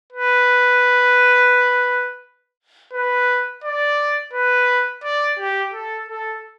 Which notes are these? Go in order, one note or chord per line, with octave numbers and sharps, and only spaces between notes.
B4
B4
D5
B4
D5
G4
A4
A4